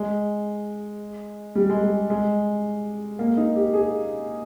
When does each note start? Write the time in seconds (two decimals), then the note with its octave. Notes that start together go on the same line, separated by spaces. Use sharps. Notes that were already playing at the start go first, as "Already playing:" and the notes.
Already playing: G#3
1.55 G3
1.70 G#3
1.83 G#3
2.10 G#3
3.19 A#3
3.37 D#4
3.56 G4
3.74 G#4